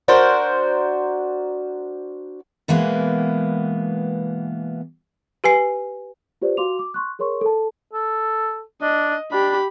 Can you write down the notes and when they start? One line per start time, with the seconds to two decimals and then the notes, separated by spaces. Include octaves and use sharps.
0.08 D4 F#4 A#4 C5
2.68 B2 E3 G#3 A#3 B3
5.44 G4 B4 G#5 C7
6.42 F4 G4 B4 C5 D5
6.57 F#4 F5 C6 D6 F7
6.79 D6
6.94 C6 C#6 F#6
7.19 G#4 A#4 C#5 C6 C#6
7.41 A4 A5
7.93 A4
8.82 D4 D#5
9.31 D4 G4 B5